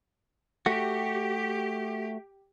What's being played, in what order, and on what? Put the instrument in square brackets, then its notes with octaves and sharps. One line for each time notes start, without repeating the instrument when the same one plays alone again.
[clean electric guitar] A3 F#4 [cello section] G4